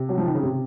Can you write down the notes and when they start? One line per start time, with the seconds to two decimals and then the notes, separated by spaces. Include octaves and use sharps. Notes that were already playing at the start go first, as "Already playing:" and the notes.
Already playing: C3
0.09 F#3
0.18 F3
0.26 D#3
0.34 C#3
0.43 C3